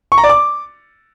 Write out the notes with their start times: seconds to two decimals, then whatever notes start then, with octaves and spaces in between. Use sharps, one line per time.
0.12 C#6
0.18 A#5
0.24 D5
0.29 D6